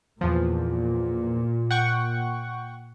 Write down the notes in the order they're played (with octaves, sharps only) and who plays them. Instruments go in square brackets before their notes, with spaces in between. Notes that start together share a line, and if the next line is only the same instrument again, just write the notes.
[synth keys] E2 F3 [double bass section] A#2
[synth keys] F#5 G5 C#6